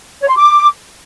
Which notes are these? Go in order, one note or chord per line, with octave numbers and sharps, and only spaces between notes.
C#5
C6
D6